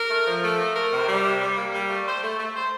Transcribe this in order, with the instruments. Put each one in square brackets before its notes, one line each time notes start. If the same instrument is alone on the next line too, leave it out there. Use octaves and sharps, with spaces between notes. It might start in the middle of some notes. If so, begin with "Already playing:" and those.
Already playing: [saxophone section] A#4
A3
F3
A3
A#4
A#4
C3
G3
C3
G3
A#3
G3
A3
C5
A3
A3
C5